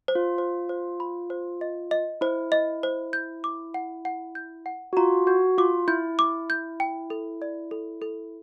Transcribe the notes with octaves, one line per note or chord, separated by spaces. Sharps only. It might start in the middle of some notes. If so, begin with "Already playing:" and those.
C5
F4
C5
C5
B5
C5
D#5
D#5
E4 C5
D#5
C5
G6
D6
F#5
F#5
G6
F#5
F#4
F4 A#5
F#4 G6
F4 D6
E4 G6
D6
G6
G5
A4
D5
A4
A4